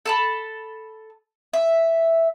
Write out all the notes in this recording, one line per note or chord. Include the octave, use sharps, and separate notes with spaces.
A4 A5 B5
E5